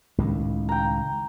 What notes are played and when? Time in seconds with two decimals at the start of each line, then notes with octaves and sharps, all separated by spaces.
0.18 C#2 A2 D#3
0.69 G5 A#5